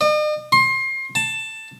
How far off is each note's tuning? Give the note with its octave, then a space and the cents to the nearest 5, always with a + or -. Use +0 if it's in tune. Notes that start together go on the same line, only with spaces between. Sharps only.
D#5 -45
C6 +30
A5 +10